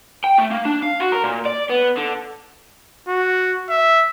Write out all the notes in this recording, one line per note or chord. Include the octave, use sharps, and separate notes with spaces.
G5
A3
A#3
D4
F5
F#4
A#4
A#2
D5
B3
D3
F#4
E5